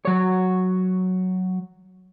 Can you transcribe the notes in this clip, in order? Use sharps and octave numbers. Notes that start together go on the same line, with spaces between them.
F#3 C#5